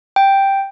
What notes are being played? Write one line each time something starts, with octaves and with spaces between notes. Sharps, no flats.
G5